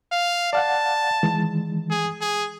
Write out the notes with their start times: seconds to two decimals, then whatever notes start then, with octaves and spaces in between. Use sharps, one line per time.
0.12 F5
0.53 D5 F5 F#5 A5
1.23 D#3 E3 G#3
1.90 G#4
2.21 G#4